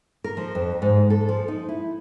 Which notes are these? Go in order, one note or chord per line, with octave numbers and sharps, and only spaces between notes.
A#4
F3
F2
G#2
A4
F3
D#4
E4